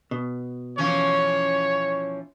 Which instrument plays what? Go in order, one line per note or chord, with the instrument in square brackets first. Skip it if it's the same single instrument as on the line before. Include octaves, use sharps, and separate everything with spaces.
[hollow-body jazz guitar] B2
[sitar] E3 F3 C#4 [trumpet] C#5